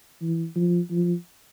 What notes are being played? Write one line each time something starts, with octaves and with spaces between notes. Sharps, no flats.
E3
F3
F3